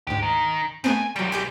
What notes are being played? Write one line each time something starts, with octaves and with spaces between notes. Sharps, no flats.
D2 G#2 G4
D#3
G#2 A3 B3 C4 G#5
C#2 F#3 G3 G5
G4 G5 G#5